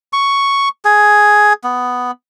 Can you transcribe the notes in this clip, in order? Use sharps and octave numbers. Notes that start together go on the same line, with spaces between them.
C#6
G#4
B3